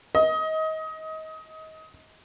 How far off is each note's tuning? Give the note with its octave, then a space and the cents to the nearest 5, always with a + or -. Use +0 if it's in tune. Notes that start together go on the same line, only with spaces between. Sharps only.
D#5 +25